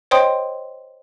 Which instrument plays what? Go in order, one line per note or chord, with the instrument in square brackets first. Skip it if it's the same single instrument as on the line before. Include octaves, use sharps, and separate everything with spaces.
[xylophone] C5 C#5 D#5 G5 C6 D#6